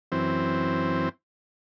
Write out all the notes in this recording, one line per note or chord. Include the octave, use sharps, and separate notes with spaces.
F#2 E3 C4